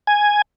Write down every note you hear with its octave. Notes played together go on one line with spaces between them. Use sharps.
G#5